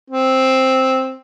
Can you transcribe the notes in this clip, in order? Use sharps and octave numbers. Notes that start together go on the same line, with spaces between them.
C4